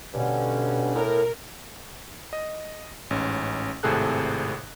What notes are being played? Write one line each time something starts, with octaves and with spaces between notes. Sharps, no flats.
G2 B2 D3 C#4
A2 A#4
D#5
A1 G#2 C#4
G#1 A2 C3 G#4 A4 F#6